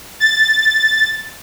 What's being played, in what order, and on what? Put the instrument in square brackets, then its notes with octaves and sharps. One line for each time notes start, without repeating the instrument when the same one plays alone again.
[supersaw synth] A6